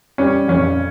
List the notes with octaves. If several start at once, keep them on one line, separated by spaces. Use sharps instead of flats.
G3 C#4
F2 C#4